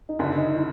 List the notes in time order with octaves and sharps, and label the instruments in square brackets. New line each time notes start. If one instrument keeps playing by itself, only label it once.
[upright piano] D#4
[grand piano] F#1 F#2 D3 [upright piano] D4
[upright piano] D#4
E4